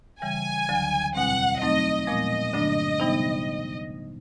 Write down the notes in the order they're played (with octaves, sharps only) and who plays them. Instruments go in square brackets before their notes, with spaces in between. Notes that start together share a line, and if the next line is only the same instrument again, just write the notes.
[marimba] C#3 E3 G3 [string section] G#5
[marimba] D2 D3 F#3
[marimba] E2 B2 G3 C4 [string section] F#5
[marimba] F#3 A3 C4 D#4 [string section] D#5
[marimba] A#2 F3 G#3 B3 [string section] D#5
[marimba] G2 D3 F#3 A3 D4
C3 E3 G3 B3 D#4